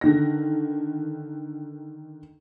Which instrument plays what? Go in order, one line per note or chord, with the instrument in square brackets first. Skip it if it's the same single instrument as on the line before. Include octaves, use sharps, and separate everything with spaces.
[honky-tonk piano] D3 D#3 A#6